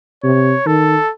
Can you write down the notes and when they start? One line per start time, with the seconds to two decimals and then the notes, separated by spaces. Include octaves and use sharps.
0.24 C3 C#5
0.66 D#3 A4